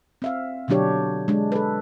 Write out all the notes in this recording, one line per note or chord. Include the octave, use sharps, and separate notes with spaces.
C4 E5 F5
B2 D3 F#3 D4 G4 C#5
G#3 D4
A4 B4